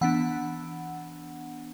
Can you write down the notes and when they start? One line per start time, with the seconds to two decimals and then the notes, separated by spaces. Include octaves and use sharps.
0.01 E3 B3 D4 F#5